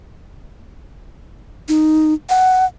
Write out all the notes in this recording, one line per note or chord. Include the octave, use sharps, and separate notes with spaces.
D#4
F#5